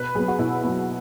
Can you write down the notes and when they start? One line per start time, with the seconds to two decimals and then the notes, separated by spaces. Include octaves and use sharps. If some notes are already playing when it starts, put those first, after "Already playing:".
Already playing: B2 B4
0.15 F#3 B3 G#4
0.28 F#4
0.38 B2 E4
0.63 F#3 B3